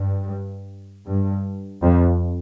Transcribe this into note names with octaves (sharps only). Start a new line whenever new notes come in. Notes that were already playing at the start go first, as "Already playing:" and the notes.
Already playing: G2
G2
F2